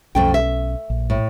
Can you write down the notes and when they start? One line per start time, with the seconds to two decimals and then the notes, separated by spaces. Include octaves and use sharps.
0.15 B1 F2 A3 C#4 G5
0.34 E5
0.90 A#1
1.10 A2